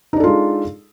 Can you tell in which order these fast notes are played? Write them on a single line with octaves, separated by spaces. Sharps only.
D#4 D4 A4 F4 G#3